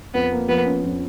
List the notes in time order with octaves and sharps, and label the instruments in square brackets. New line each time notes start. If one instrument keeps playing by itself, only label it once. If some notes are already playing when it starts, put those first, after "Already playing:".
[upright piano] F2 [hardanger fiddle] B3
[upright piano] A#3
[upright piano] F3 [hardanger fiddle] B3
[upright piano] C#4
F2